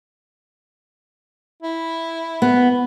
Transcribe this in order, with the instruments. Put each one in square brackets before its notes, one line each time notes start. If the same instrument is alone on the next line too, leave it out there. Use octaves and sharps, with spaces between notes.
[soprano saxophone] E4
[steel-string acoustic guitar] B3